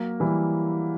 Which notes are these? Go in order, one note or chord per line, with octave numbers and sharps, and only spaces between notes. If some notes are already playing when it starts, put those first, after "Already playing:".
Already playing: F#3 A#3
E3 G3